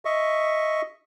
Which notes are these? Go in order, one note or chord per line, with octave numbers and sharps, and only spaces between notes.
D#5 E5 C#6